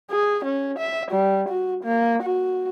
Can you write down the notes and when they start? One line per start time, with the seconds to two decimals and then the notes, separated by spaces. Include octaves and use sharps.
0.11 G#4
0.45 C#4
0.78 E5
1.11 G3
1.49 F#4
1.84 A#3
2.23 F#4